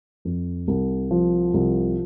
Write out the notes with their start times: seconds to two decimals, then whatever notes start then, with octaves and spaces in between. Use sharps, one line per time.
0.25 F2
0.68 C2
1.11 F3
1.54 C2